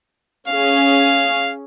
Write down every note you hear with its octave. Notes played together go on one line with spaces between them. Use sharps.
C#4 G#4 F5